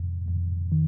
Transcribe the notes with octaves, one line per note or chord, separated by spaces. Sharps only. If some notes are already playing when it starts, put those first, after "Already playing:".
Already playing: F2
F2
D#3